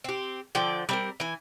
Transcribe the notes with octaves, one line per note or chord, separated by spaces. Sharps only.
C4 G4
D3 F3 D5 G5
G3 C4 A#4
E3 G#5